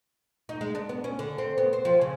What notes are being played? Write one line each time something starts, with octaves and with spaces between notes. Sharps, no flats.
D#4
G#3
D4
B3
C#4
D3
C4
B3
C5
F3
C#3